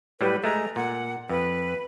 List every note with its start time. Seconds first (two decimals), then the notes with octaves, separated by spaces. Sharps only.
0.21 A2 F#3 G3 B4
0.44 G#3 A3 A#5
0.76 A#2 F#5
1.29 F2 B4